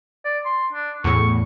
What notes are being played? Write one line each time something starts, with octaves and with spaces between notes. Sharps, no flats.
D5
C6
D4
E2 A2 C#6